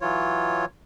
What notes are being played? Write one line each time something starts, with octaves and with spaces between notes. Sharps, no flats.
E3 F#3 F4 C#5